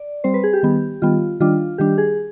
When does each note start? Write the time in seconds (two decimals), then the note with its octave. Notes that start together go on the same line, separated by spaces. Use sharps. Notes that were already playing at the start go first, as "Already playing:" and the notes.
Already playing: D5
0.24 G3 C4 C5
0.34 B4
0.44 G#4
0.53 G4
0.63 D#3 G3 B3
1.02 D#3 G3 B3 F4
1.40 D#3 G3 D4 F4
1.78 D#3 G3 D4 G4
1.98 G#4